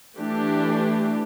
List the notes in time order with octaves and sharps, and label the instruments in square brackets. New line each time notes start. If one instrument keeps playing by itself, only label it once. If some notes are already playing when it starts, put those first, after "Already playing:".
[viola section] E3 A3 D4 G4